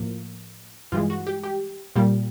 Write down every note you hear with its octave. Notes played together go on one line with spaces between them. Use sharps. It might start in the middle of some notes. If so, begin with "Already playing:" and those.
Already playing: A2 F3 A#3
G2 E3 G#3 F4
F#4
G4
G4
A#2 G3 A#3